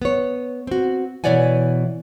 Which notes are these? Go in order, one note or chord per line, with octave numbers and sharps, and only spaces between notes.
B3 C#5
C4 F#4
B2 E3 C#5 D5 F#5 G#5